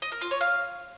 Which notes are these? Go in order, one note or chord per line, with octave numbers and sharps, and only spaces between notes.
D#5
A#4
F4
C#5
F5